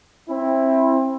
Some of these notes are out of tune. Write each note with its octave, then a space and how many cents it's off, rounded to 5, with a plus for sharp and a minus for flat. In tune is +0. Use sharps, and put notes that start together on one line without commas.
C4 +25 E4 +0